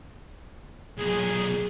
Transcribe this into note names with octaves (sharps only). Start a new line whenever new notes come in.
B1 A#2 G#4